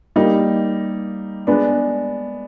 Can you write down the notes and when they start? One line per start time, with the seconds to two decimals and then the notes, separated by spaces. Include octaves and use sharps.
0.16 G3 A#3 D#4
1.47 G#3 B3 D4